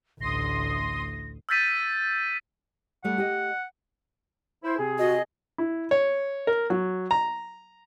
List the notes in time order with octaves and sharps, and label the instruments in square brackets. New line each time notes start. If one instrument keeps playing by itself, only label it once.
[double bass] A1 D2 [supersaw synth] C6 D#6 [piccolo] A#6
[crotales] E6 F6 G6 A6 B6 D#7
[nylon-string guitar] G3 A3 [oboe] F#5
[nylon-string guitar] G4 D#5
[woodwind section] E4 C5
C3 C4 G#4
[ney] F#4 [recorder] D#5
[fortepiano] E4
C#5
A#4
F#3
A#5